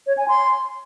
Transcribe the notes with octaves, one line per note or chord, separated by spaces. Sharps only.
C#5
G#5
C6